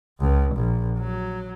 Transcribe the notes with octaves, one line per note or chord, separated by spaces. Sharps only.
C#2
A#1
F#3